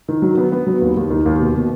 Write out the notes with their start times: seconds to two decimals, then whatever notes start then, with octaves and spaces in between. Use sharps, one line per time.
0.08 D#3
0.22 F#3
0.38 B3
0.52 B3
0.67 F#3
0.82 D#2
0.97 D#2
1.10 D#3
1.26 D#2
1.40 B2
1.54 B2